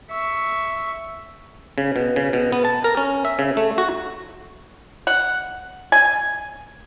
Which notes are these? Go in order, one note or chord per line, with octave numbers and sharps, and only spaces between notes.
E5 C#6
C#3
B2
C#3
B2
B3
A5
A#4
C#4
E5
C#3
A3
F#4
F#5
G#5